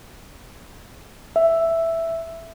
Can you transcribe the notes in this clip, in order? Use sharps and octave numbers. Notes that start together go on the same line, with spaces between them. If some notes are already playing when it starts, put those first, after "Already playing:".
E5